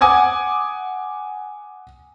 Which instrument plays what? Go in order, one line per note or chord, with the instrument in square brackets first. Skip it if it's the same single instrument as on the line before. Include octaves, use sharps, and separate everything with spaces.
[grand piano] F#5 G#5 D6 D#6 G#6